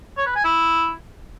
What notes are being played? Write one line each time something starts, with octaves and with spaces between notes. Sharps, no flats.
C#5
B4
G#5
E4